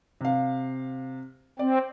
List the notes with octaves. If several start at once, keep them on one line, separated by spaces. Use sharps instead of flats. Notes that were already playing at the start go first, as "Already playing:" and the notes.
C3 F5
C4 D5